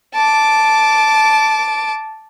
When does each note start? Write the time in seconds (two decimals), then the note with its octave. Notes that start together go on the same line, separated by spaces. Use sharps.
0.14 A5 D6